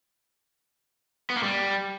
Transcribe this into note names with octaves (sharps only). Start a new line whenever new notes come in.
B3
A#3
G3